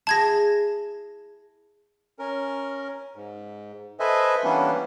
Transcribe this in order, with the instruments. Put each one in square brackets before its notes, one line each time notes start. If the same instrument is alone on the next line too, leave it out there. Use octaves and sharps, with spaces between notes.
[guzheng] E4 G#4 [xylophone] A5 G#6 A#6
[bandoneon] C#4 A#4
G#2
A4 B4 C5 D#5 E5 G#5
E3 G3 A#3 B3 C#4 D4